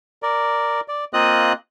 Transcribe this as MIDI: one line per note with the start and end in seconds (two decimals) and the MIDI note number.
0.23 0.80 70
0.23 0.80 74
0.88 1.05 74
1.13 1.53 58
1.13 1.53 60
1.13 1.53 65
1.13 1.53 75
1.13 1.53 87
1.13 1.53 90